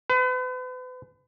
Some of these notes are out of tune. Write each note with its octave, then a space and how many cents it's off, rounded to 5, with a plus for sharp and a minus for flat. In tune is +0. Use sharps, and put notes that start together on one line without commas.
B4 +40